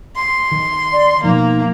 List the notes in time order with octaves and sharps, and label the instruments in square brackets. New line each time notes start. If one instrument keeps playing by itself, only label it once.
[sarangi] C6
[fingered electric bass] D#3
[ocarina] D5
[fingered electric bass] B2 F3 [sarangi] A#3 [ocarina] D#4